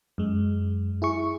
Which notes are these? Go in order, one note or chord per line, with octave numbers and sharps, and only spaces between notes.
F#2 G#3
E4 G#4 C#6